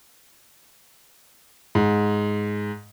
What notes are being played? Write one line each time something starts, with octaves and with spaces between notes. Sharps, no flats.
G#2